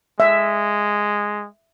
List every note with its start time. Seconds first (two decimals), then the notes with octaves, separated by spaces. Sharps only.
0.20 G#3 E5